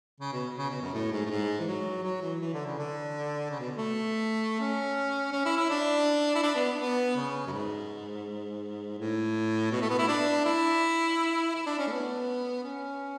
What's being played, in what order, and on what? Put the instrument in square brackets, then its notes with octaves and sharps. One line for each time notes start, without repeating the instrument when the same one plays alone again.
[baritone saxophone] C#3
B2
C#3
B2
F#2
A2
G#2
A2
G#2
E3
F#3
F#3
E3
E3
D3
C#3
D3
C#3
B2
A3
C#4
C#4
E4
E4
D4
E4
D4
B3
B3
C#3
F#2
G#2
A2
B2
A3
B3
E4
D4
E4
E4
D4
C#4
A3
B3
C#4